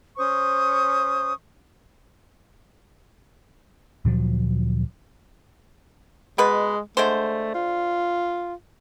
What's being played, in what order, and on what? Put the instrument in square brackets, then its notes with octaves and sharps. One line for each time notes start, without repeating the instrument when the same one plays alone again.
[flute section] C#4 C5 C#6 D#6
[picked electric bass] D2 A#2 F3 F#3
[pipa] B2 B4 [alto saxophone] G#3
[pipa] D3 G#3 C5 [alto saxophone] A3
[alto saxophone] F4